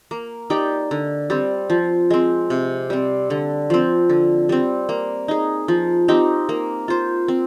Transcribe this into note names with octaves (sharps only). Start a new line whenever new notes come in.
A#3
D#4 G4 D5
D3
G3 C4
F3
G#3 C4
C3
G3 C4
D3
F3 C4
D3
G3 C4
A#3
D#4 G#4
F3
C4 D#4 G4
A#3
F4 C5
C4